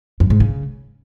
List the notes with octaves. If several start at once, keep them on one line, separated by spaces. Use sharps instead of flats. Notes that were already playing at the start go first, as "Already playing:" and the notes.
F#2
G#2
C#3